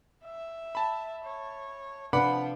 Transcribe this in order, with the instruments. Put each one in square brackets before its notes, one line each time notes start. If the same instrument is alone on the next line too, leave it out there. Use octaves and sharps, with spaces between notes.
[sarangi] E5
[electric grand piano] A5 B5
[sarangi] C#5
[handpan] C3 D4 B4 [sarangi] F3 [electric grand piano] F#5 B5 D6